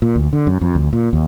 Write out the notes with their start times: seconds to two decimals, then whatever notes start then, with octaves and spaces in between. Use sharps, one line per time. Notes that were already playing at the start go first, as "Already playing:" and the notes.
0.02 A#2
0.16 D2
0.33 D3
0.47 F#2
0.61 F2
0.75 D2
0.93 A#2
1.13 D#2